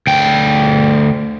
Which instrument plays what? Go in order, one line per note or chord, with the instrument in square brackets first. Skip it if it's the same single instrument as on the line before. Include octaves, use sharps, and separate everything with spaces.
[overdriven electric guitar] D2 G5